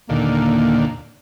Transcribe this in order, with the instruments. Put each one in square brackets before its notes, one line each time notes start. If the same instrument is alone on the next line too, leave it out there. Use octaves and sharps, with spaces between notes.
[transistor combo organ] D#2 A#2 D3 [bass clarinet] A#3